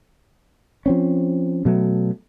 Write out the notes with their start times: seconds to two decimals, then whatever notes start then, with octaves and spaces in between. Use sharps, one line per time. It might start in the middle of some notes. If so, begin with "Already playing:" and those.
0.86 F3 C4 C#4
1.65 B2 F#3 A3